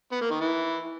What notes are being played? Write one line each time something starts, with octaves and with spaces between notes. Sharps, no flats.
B3
A#3
D#3
E3